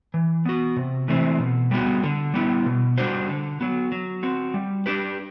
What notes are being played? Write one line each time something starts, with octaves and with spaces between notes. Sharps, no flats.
E3
B3 F#4
C3
E3 A3 C4
B2
G3 B3 F#4
D3
G3 B3 E4
B2
G3 D4 F#4 C5
D3
F#3 B3 F#4
F#3
C4 F#4
G3
D4 G4 B4